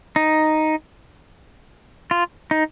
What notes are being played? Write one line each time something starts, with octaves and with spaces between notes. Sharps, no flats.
D#4
F4
D#4